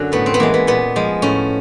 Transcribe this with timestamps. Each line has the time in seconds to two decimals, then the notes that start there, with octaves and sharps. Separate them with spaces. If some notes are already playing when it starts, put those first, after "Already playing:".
Already playing: F#2 D3 F#3
0.12 A2 B3
0.26 C4
0.34 B3
0.40 E3 G#3 A#3
0.54 B3
0.67 A#2 B3
0.96 F3 G#3
1.22 A2 C#4